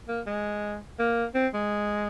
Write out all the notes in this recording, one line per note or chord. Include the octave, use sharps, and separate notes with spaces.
A#3
G#3
A#3
C4
G#3